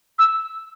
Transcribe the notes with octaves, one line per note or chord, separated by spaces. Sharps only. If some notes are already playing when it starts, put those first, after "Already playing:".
E6